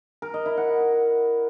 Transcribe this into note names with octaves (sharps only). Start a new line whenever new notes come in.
A#4
D#5
E4
F#5